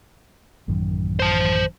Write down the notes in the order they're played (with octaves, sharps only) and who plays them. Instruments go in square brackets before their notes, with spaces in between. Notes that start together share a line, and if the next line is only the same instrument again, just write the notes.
[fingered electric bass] A1 F#2 D#3
[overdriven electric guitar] C5 A5